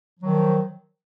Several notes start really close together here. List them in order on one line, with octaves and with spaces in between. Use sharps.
F3 F#3 D#3